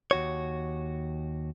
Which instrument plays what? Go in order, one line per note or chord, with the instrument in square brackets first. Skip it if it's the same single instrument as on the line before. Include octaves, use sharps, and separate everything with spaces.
[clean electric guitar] D#2 F#4 C#5